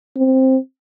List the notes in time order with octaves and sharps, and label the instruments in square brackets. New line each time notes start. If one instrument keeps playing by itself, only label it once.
[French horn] C4